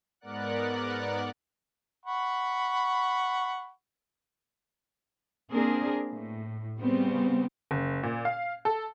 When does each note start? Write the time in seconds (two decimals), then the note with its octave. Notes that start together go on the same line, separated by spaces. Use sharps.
0.20 G#2 B3 A#4 D5 F#5 F#6
2.05 F#5 B5 C#6
5.51 A#3 C4 D4 G#4 A#4
6.11 A2
6.79 C#3 G3 B3 C4
7.71 F#1
8.03 A#2
8.25 F5
8.65 A4